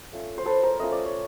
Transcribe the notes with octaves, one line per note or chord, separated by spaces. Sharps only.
A3 C#4 F4
C5
A4 B4
A#4 C5
A3 C#4 F4 D#5
D5
C#5